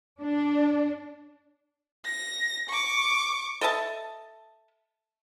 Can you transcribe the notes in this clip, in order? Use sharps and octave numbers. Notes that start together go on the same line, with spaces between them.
D4
A#6
C#6 D6
A4 D#5 E5 A5